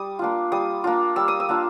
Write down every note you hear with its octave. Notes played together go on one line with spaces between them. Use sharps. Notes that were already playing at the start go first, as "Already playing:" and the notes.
Already playing: G3 D#6
A#3 D4 F4
G3 D#6
A#3 D4 F4
G3 E6
D#6
E6
A#3 D4 F4